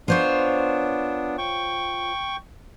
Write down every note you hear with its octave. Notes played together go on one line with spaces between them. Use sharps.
B3 D4 F4 C5 C#5
G5 C#6